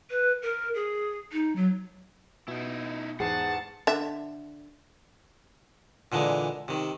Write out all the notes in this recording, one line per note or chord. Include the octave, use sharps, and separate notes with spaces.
B4
A#4
G#4
D#4
F#3
B2 D#4 E4
E2 G#2 G#4 F#5 A5 C7
D3 E5
A#2 D3 E3 G#3
C3 D#3